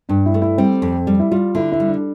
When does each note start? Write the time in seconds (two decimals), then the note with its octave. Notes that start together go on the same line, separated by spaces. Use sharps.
0.09 G2 D4
0.26 E4
0.34 A3
0.42 E4
0.58 G3 C4
0.82 F2
1.07 G3
1.19 E4
1.31 G3 F4
1.55 D3 E4
1.72 E4
1.80 G3
1.87 D4